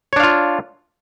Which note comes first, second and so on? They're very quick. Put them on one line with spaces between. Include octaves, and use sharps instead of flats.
C#5 D4 F5 F4